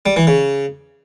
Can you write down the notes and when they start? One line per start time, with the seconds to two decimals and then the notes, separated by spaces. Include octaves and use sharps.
0.06 G3
0.16 E3
0.27 C#3